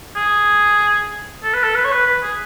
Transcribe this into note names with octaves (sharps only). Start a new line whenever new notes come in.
G#4
A4
B4
A4
B4
C#5
B4
B4
G#4